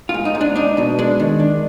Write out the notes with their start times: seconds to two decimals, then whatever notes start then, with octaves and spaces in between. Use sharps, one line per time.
0.09 F4
0.14 G#2
0.25 D#4
0.35 G#2
0.41 D4
0.56 D4 D#4
0.77 B2 D#4
0.99 G#3 D4
1.20 D#3
1.40 D4